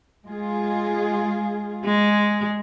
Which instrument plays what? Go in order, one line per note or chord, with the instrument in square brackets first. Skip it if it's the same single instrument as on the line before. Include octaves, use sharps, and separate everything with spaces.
[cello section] G#3 F4 G#4
[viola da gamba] G#3